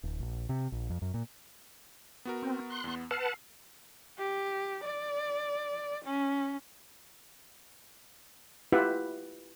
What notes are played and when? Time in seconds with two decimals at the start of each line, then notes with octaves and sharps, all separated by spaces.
0.03 D1
0.20 A#1
0.49 C3
0.72 A#1
0.90 F2
1.02 F#2
1.14 A#2
2.25 B3 F#4 A#4
2.43 C4
2.70 C6 F#6
2.84 E2 B3
3.11 B4 F#5 A5 E6 F6 C7
4.18 G4
4.84 D5
6.04 C#4
8.72 E4 F4 G4 B4 E5 F#5